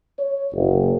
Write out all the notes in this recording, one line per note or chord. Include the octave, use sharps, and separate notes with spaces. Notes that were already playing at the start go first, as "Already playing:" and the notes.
C#5
F#1